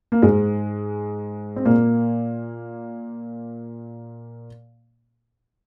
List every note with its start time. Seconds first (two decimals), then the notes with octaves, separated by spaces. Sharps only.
0.12 A#3
0.22 G#2 G#3
1.56 C4
1.65 A#2 A#3